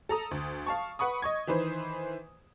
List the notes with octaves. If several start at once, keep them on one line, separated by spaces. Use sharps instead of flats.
A4 A#5 D#6
D2
F5 A5 C#6
B4 F#5 B5 C#6 D#6
D#5 C#6 G#6
D#3 E3 B4 C5